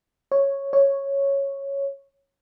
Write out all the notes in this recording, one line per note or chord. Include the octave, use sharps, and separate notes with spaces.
C#5
C#5